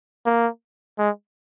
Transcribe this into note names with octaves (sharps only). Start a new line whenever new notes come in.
A#3
G#3